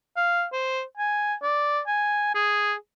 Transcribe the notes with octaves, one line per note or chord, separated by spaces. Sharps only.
F5
C5
G#5
D5
G#5
G#4